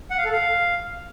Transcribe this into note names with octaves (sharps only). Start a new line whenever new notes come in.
F#5
F5
A4
F5